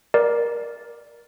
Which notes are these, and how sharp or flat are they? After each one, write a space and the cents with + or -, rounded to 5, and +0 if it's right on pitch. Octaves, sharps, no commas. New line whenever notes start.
A#4 +20 D5 +0